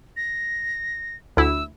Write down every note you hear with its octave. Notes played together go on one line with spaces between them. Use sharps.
A#6
D2 E4 E6